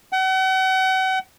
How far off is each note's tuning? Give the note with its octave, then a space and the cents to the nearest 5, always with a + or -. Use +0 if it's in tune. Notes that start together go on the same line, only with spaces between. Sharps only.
F#5 +40